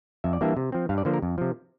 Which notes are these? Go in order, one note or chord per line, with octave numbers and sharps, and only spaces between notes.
F2 E5
D5
E3 G3 A#3 D4 E5
C3
F3 C4
G2 F5
D5
D3 F3 A#3 C5
A#4
F2
C3 F3